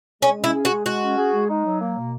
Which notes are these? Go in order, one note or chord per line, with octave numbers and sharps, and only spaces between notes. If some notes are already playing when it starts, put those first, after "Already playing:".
G#3 C#4
C#4
E4
G#4
F#4
G#3
G#3 F#4
C#4
G#4
G#3
D#4
F#3
A#3
B2